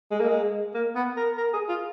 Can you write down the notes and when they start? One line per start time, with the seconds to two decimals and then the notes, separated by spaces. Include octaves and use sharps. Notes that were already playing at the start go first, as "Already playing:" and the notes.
0.11 G#3
0.20 A#3
0.28 G#3
0.74 A#3
0.95 B3
1.17 A#4
1.37 A#4
1.54 G#4
1.69 F4